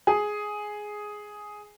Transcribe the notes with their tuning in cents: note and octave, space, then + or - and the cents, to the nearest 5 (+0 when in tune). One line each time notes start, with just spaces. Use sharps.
G#4 +5